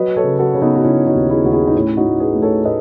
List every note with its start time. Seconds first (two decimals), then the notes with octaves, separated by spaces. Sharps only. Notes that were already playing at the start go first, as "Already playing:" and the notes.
Already playing: F#3 B4 D#5
0.16 A4 C#5
0.24 C#3
0.39 F#4 A4
0.54 C#3
0.62 B3 D#4
0.75 F#4
0.84 C#3 C#4 E4
1.07 D#4 F#4
1.15 D#2
1.29 E4 G#4
1.45 D#2 F#4
1.52 E4 G#4
1.67 D#4
1.75 A2 C#4 E4
1.97 D#4 F#4
2.05 A2
2.20 G#4 B4
2.35 A3
2.42 A4 C#5
2.65 A2 B4 D#5